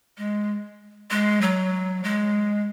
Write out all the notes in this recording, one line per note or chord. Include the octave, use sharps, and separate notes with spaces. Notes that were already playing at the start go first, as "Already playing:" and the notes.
G#3
G#3
F#3
G#3